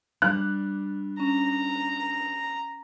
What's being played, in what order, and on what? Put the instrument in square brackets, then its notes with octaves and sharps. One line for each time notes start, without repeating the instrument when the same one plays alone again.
[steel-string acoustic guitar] G3 D4 [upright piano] F#6
[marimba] C#4 [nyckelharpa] A#5